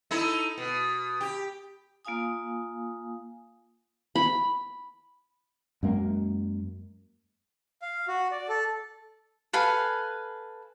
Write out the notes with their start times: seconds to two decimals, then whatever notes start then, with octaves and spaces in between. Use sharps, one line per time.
0.11 D#4 E4 A4
0.58 B2
1.21 G4
2.05 A#3 F4 F5 G#5 D#6
4.15 B5
5.83 F#2 G#3 A#3
7.82 F5
8.08 F#4
8.31 D5
8.49 A4
9.53 A4 B4 F5 G#5